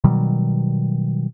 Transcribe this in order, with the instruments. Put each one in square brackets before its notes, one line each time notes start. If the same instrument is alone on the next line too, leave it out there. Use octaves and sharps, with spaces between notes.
[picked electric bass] B2 D#3 F#3 G3